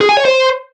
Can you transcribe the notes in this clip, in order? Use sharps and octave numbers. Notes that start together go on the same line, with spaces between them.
G#4
G#5
C#5
C5